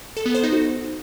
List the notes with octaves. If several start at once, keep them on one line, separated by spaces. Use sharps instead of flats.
A4
B3
C5
D#4
F#4